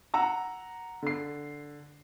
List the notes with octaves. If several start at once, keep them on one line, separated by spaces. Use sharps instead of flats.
F#5 A#5 E6
D3 C7